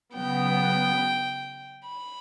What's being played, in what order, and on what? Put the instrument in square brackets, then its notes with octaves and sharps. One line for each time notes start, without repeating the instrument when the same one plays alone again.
[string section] C#3 F#3 B3 [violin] G5
[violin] B5